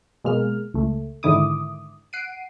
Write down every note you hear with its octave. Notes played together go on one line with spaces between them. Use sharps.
B2 G#3 A#3 F6
C#2 A3
G#2 D3 D#3 E4 D6 D#6
F#5 C7 D7 D#7